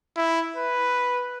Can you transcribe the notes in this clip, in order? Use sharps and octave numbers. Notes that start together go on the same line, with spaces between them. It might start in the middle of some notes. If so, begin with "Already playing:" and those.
E4
B4